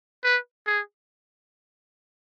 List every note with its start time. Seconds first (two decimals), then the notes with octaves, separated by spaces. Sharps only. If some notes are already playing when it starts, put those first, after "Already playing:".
0.24 B4
0.67 G#4